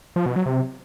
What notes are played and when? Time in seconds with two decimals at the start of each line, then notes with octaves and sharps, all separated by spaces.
0.16 F3
0.26 B2
0.36 F#3
0.46 C3